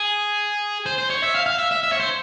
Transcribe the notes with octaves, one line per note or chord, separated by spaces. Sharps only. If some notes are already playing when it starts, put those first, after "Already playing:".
Already playing: G#4
C5
C5
C#5
E5
F5
F5
E5
E5
E5
C#5
C5